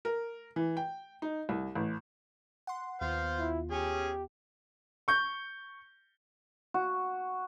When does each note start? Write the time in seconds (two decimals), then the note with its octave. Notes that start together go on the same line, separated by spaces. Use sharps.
0.05 A#4
0.56 E3
0.77 G5
1.22 D#4
1.49 C2
1.75 A1
2.67 F#5 C6
3.01 D#2 B3 F4 C5 F5
3.39 E4
3.71 C#4 G4 G#4 G#5
5.08 C#6 G6
6.74 F#4